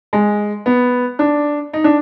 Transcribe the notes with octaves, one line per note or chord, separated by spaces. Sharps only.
G#3
B3
D4
D#4
D4